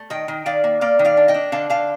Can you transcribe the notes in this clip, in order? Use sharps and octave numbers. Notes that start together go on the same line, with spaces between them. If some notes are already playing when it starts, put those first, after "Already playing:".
Already playing: A3
D#3 D#5 G5
D#3
D#3 D5 F5
A#3
A#3 D5 F5
D#3
D5 F5
D4
D#5 G5
D4
D3 F5 A5
D3 F5 A5